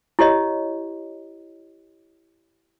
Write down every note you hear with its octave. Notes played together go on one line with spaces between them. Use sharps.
E4 G4 C#5 D#5